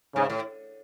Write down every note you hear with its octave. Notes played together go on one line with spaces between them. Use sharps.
G#2 C#3
A2